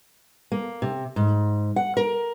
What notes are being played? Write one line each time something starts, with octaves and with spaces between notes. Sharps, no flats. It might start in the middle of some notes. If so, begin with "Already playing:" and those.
A#3
C3
G#2
F#5
A#4